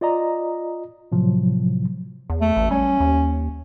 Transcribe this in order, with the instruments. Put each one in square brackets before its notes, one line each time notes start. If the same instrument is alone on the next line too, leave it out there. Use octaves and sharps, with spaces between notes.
[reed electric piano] F4 D5 D#5 A#5
A2 C3 F3 F#3
[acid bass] E2
[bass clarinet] A3
[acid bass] A1
[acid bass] G3 [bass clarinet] C#4
[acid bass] D#2